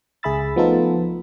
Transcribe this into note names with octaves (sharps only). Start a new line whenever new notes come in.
C#2 G#4 E5 B5 E6 A6
F3 A3 B3 D#4 F4 A4